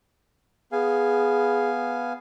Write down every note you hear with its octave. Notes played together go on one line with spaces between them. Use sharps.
B3 G#4 F5 G#5